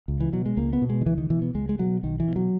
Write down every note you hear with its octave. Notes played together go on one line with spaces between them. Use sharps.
C#2
E3
B2 F#3
G#3
C#2 A#3
B3
B2
G#3
D#3
C#2 E3
D#3
B2 E3
B3
C#2 G#3
G#3
B2 F#3
B1 D#3
E3
B2
F#3